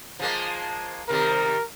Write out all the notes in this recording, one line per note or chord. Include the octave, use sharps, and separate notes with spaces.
F3 G#3 A#3
C3 D#3 G3 A#4